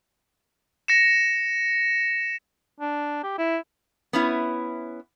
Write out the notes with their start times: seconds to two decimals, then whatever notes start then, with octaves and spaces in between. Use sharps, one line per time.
0.88 A#6 C#7 E7
2.80 D4
3.23 G4
3.38 E4
4.13 B3 C#4 E4